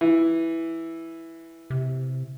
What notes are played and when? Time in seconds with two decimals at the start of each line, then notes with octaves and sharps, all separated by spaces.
0.01 E3
1.70 C3